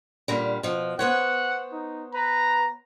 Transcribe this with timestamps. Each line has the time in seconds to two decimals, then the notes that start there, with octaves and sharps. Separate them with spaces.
0.28 A#2 D3 G3
0.63 B2 F3
0.99 B3 C5 C#5 F#5
1.72 D#4
2.14 B4 A#5